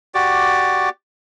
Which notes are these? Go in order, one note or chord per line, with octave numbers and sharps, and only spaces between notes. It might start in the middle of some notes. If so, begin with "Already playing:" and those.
F#4 G4 D5